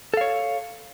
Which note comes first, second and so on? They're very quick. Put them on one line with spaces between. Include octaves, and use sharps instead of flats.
A4 F5 C#5